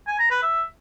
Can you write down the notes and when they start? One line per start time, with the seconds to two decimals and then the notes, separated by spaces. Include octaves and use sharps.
0.07 G#5
0.19 A#5
0.31 B4
0.43 E5